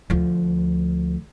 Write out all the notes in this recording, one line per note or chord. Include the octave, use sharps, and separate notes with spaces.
D2 F3